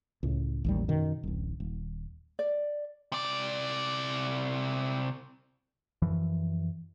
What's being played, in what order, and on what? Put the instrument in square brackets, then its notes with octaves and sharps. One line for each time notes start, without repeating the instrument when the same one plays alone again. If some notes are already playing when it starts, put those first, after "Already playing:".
[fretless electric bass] C#2 A2
A1 D#2 G3
F#2 B2 D#3
D1 A1
D#1
[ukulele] D5
[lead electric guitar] C3 D5
[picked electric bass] F#2 E3 F3